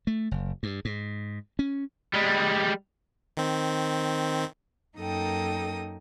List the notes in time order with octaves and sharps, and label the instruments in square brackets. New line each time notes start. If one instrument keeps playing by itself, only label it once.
[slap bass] A3
F#1
G2
G#2
C#4
[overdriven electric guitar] G3 G#3
[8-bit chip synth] D#3 C4
[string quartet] F#2 A#3 D#4 A4 G5 D#6